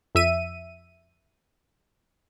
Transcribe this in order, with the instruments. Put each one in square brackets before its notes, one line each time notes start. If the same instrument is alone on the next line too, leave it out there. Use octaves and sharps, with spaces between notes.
[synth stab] F2 E5 D#7